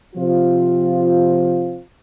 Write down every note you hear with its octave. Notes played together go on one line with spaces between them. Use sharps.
C3 F3 C4 F4